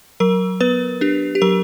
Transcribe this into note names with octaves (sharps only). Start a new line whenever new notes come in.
F#3 A#4
B3 B4
D4 G4
G4
F#3 A#4